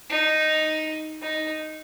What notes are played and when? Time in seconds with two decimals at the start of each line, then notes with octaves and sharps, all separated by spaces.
0.10 D#4
1.22 D#4